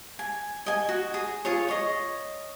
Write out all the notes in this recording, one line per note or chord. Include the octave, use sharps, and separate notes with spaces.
G#5
D#5 G#5
F#4
G#4
F4 G#4 C#5
C#5 D#5